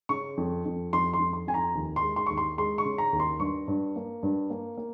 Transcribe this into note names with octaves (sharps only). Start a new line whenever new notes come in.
C#3 C#6
F2
F2
F2 C6
C6
F2
C6
F2 G#5
A#5
D#2
C6
G#3
C6
D#2 C#6
C6
G#3 C6
C#6
C#3
A#5
D#2
C6
G2 C#6
G2
A#3
G2
A#3
A#3